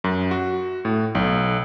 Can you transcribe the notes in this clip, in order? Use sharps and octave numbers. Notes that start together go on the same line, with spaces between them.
F#2
F#4
A2
B1